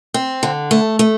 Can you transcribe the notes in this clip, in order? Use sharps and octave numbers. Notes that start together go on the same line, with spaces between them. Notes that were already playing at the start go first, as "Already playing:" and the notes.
C4
D3
A3
A3